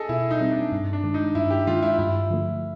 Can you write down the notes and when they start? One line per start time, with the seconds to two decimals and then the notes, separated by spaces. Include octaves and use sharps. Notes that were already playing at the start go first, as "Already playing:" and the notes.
Already playing: G#4 A4 D#5
0.09 B2 E4
0.30 D#4
0.41 G3 C4
0.51 D4
0.72 G2
0.93 D4
1.04 D#3 G#3
1.14 D#4
1.35 G2 E4
1.51 G4
1.67 D#3 G#3 F4
1.82 E4
1.98 G2 E4
2.30 D3 F3 A3